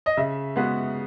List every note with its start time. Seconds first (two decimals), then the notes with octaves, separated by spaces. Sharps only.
0.06 D#5
0.17 C#3 E5
0.56 G#3 B3 F#4